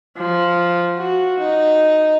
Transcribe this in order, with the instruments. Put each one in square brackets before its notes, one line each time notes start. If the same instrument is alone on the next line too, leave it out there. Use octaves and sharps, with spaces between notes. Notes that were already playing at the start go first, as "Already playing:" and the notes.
[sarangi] F3
F#4
D#4